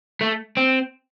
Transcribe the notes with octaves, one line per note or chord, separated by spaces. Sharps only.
A3
C4